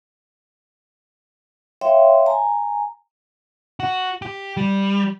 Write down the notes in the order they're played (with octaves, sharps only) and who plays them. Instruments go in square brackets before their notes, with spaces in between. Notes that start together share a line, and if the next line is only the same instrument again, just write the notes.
[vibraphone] C#5 E5 F5 G5 C6
G#5 A#5
[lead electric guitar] F#4
G4
G3